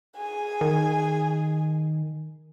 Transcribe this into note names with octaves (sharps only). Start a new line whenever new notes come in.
G#4 G#5
D#3